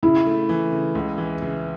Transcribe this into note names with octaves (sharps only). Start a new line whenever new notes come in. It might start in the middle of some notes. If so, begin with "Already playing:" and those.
C#3 E4
A3
E3
C#3
C#2
E3
C#3